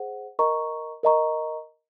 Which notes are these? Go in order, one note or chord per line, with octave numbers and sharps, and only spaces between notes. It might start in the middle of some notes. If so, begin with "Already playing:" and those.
Already playing: G#4 C5 F#5
A#4 D#5 A#5 C#6
A#4 D#5 A#5 C#6